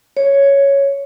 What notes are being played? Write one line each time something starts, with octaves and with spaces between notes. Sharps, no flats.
C#5